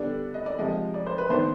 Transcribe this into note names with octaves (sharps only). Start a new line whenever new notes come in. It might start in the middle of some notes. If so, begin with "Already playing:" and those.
Already playing: D3 G3 B3 D4 D5
D#5
D5
C3 F3 G#3 D#5
D5
C5
B4
D#3 B3 D4 C5